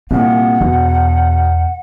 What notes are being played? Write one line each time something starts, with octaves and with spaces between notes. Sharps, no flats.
C2 A#2 C4 F#5
E2 B2